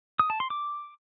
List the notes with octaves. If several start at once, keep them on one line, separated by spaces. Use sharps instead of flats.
D#6
A5
C6
D6